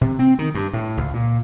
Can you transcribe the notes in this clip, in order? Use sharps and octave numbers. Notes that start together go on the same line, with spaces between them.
C3
C4
D#3
G2
A2
C#2
A#2